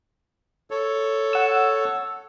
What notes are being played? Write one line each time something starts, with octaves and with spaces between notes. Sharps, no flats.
A4 C#5
F#5 E6